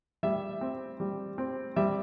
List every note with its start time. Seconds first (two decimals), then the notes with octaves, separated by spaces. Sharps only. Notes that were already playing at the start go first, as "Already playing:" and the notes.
0.23 G3 E5
0.61 C4
1.00 G3
1.38 C4
1.76 G3 E5